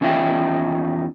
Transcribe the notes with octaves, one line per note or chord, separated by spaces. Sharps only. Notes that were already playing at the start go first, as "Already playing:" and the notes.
E2 C#4 D#4 F4 E5 G5